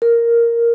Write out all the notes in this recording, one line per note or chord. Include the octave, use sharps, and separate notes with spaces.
A#4